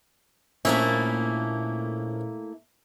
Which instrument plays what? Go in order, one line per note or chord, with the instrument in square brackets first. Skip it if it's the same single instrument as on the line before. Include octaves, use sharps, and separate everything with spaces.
[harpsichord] A#1 C#4 D#6 [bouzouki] A3 A#3 E4